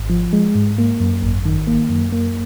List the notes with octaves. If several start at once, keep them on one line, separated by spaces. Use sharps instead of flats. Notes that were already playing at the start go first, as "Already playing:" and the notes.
Already playing: G#1
F3
G#3
G#2
A#3
F#2
G#1
D#3
A#3
F#2
A#3